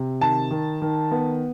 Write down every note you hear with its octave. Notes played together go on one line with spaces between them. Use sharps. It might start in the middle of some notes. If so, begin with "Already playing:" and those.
Already playing: C3
D#3 A5
D#3
D#3
B3